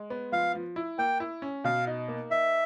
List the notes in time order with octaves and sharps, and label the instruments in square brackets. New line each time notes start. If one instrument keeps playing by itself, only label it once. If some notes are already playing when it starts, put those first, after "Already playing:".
Already playing: [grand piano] G#3
B3
[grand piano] F3 [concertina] F5
[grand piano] F3
E4
[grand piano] A#3 [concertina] G5
[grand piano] E4
C#4
[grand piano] B2 [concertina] F5
[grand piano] D#4
A#3
[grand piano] D#4 [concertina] E5